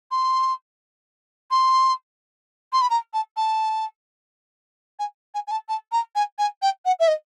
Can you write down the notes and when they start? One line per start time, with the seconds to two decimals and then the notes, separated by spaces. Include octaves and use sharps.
0.11 C6
1.51 C6
2.72 C6
2.81 B5
2.90 A#5
3.13 A5
3.36 A5
4.99 G#5
5.34 G#5
5.47 G#5
5.51 A5
5.68 A5
5.92 A#5
6.15 G#5
6.38 G#5
6.62 G5
6.85 F#5
6.99 E5
7.08 D#5